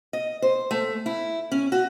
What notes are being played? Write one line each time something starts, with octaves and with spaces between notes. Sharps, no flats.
D#5
C5
A3
E4
C#4
F#4